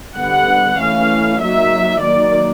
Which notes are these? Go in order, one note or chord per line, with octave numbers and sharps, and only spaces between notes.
D3 G3 B3 F#5
E3 A3 C#4 F5
F#3 A#3 D#4 E5
D#3 F#3 A#3 D5